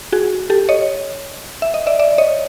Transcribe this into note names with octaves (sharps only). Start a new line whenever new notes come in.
F#4 G#4
G4 A4
C#5 D#5
E5
D#5
D5 E5
D5 E5
C#5 D#5